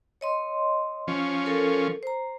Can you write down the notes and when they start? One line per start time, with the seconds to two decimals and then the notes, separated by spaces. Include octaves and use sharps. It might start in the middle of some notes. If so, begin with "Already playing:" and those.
0.21 C#5 D#5 C6
1.08 F3 C#4
1.46 A4 A#4
2.03 C5 A#5